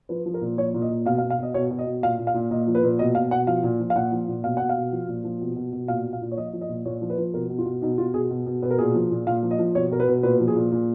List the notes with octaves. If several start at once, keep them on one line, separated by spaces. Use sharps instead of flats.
F3 B4
F3
A#4
A#2
F3 C#5
A#2
D#5
A#2
B2 F5
F5
B2
F5
B2 D#5
B2 C#5
B2
D#5
B2
A#2 F5
A#2
F5
A#2
A#2 D#5
F3
B4
A#2
B2 D#5
B2 F5
B2 F#5
F3 F5
A#2
F3
F5
A#2 F#5
F3
A#2
B2 F5
B2 F#5
F5
B2
F3
A#2
F3
B2
B2
B2
A#2 F5
A#2
F5
A#2
C#5
F3 D#5
F3
D#5
A#2
A#2 C#5
F3
B4
F3
B2 A#4
B2
F4
B2
B2 D#4
B2 F4
B2 G#4
B2
B2
B2 B4
A#4
A#2 G#4
F3
A#2
A#2 F5
F3
D#5
F3
B2 C#5
B2 A#4
B4
B2
A#2 B4
F3
G#4
A#2
A#2